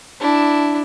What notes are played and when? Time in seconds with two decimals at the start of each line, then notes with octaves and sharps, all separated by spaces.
0.20 D4 E4